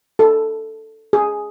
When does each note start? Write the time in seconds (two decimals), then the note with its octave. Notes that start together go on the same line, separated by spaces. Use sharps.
0.19 A4
1.13 G#4